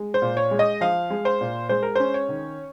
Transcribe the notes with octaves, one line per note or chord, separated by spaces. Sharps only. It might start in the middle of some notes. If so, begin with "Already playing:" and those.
Already playing: G#3
C5
A#2
C#5
G#3
D#5
F3 F5
G#3
C5
A#2
G#3 C5
A#4
C#4 C5
C#5
D#3